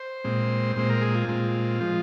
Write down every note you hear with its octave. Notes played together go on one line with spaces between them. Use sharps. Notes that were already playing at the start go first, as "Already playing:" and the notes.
Already playing: C5
A#2 G#3 C4
A#2 G#3 C4 C5
A#4
G#4
F4
A#2 G#3 C4
F3 G#3